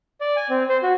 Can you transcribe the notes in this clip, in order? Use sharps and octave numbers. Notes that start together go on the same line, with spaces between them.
D5
G#5
C4
C5
F#4